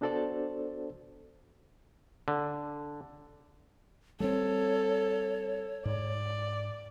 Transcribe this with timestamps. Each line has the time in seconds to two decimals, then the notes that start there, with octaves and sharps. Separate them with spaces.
0.01 B3 D4 F#4 A4 C5 D5
2.28 D3
4.20 G3 G#3 C4 A4 C#5
5.85 G#2 D5